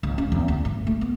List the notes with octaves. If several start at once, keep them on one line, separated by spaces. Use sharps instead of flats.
C#2
C#4
E2
D2
G2
A3
B3